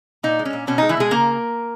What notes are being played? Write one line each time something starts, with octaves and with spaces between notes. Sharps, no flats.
A#2 D#4
G#3
C#4
A#2
B2 C#4
G#3 D#4
E3 E4
B2 G#3 G#4
C#3 A#3 A#4